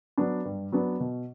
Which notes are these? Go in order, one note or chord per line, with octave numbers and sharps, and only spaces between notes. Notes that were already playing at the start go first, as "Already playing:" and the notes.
F#3 B3 D4
G2
F#3 B3 D4
B2